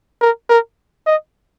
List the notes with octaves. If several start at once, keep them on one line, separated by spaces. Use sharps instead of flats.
A#4
A#4
D#5